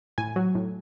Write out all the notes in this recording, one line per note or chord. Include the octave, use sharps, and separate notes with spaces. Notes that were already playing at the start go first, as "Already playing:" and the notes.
A2 G#5
F#3
A2